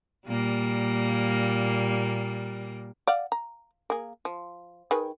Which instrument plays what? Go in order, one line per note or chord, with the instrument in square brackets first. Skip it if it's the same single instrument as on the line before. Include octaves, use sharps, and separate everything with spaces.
[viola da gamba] A#2 G3 A#3
[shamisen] D5 F5 F#5
A#5
A#3 G#4
F3
D#3 G#4 B4